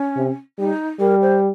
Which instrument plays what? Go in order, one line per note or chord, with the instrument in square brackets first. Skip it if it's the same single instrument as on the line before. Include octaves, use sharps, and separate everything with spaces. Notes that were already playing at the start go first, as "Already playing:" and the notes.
Already playing: [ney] C#4
[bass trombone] C3
[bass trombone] G3 [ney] D#4
[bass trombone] G3 [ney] A#4
[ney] C5